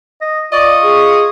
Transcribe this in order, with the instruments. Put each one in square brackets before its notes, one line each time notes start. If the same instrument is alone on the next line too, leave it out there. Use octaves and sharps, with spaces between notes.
[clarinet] D#5
[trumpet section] F4 C#6 [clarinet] D5 [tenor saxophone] D#5
[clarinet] G#4